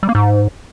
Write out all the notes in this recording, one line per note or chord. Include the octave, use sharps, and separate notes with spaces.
G3
A#3
G#2